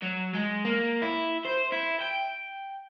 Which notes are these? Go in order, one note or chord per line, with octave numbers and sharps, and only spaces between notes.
F#3
G#3
A#3
E4
C5
E4
G5